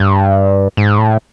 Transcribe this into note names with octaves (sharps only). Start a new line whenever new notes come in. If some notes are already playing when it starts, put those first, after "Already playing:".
Already playing: G2
G#2
A2